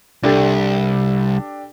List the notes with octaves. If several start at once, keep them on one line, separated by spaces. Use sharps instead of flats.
C2 D4 G4 A4